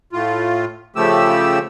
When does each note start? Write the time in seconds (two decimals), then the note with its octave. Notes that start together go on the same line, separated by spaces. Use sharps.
0.13 A2 F4
0.96 C#3 F3 A3 G4 E6